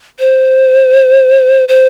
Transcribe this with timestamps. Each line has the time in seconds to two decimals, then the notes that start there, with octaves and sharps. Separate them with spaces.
0.20 C5
1.69 C5